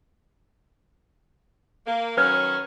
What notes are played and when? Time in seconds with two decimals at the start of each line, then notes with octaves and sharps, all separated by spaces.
1.86 A#3
2.17 D#3 F#3 C#4 B4 F6 G#6